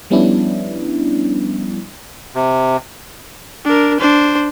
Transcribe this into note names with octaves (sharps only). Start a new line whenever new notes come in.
F3 G3 B3 C#4 D4 E4
C3
D4 A#4
D4 C5